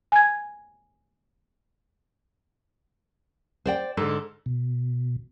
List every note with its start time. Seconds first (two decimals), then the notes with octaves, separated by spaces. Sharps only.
0.12 G#5 G#6
3.66 C5 D5 G5
3.97 G#2 D3 A4
4.46 B2